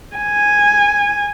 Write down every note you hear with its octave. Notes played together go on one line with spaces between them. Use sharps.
G#5